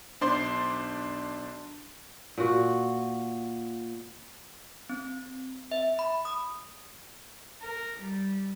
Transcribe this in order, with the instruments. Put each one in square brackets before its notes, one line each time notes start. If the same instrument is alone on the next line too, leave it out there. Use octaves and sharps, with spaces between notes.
[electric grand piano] B1 D4 C5 D5 C6 C7
[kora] A#2 F#4
[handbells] C4
E5
B5
D#6
[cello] A#4
G3